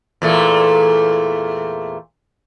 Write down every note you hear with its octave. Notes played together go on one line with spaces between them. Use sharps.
E2 A#2 A3